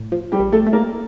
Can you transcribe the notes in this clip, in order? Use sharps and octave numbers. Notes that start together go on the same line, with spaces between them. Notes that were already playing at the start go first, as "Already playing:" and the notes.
Already playing: A2
F3
G3 G4
A#1
A3 A4
A3
A#3 A#4